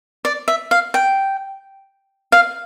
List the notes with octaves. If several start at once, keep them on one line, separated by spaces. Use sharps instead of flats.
D5
E5
F5
G5
F5